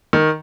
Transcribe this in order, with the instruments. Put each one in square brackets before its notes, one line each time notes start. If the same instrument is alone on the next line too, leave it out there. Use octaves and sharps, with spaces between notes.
[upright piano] D#3